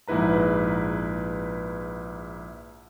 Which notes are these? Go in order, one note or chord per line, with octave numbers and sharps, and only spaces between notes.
A#1 G#2 E4 B4 A#5